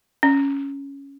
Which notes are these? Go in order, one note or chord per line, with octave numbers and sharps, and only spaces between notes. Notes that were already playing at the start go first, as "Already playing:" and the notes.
C#4